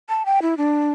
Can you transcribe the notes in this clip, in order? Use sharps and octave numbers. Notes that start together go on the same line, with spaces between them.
A5
G5
E4
D4